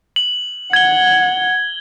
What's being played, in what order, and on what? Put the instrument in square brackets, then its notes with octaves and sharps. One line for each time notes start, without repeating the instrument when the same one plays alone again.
[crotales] F#7
[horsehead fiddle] F#5 [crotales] G#6 G7